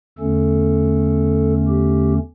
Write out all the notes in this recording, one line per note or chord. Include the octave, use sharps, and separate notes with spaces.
E2 D3 A3 C#4 A4
G4